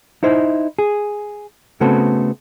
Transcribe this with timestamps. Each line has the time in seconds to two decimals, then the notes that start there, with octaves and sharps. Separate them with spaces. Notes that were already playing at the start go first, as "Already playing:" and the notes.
0.23 D#4 E4 C5
0.79 G#4
1.81 C#3 A3 B3 C4 F#4 A4